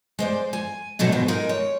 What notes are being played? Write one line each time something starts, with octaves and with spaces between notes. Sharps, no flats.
G#3 C5 D5
G#5
G#2 B2 F#3 A3 D4
G#2 B2 D#3
G#3 D#4 A#4 D#5
C#5